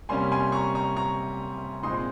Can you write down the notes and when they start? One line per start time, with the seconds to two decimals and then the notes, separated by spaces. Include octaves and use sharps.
0.09 C3 G3 A#3 C#4 G#5 C6
0.32 G#5 C6
0.52 A#5 C#6
0.75 A#5 C#6
0.97 A#5 C#6
1.83 A#2 G#3 C4 D#4 C6 D#6
1.94 C6